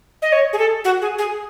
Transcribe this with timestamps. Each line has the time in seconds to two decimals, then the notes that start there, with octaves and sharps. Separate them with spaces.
0.22 D#5
0.32 C#5
0.53 G#4
0.58 A4
0.84 F#4
1.02 G#4
1.18 G#4